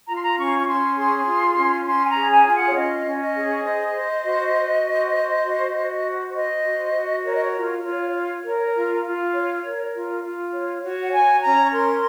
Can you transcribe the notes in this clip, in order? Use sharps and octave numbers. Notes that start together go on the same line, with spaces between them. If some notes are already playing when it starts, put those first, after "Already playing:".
F4 A#5
C6
A#5
C#4 C#6
C#6
C#4 C6
G#4 C6
F4
C#4
C#4 C6
G#5
A#5
G#4
G#5
F4 G#5
F#5
C#5
C#4 D#5
C#4
D#5
G#4
C5 D#5
C5
F#4
F#4
C5
C5
F#4
F#4
C5
C5 D#5
F#4
F#4
A#4 C#5
D#5
C#5
F4
F4
C#5
A#4
F4
F4
C#5
A#4
F4
F4
C#5
F#4 C#5
F#5
C#5 G#5
C#4 A#5
C#6
A#4 C6